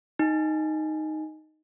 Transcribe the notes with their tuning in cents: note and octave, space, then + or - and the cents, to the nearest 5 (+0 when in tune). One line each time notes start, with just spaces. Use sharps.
D#4 +0 G#5 +0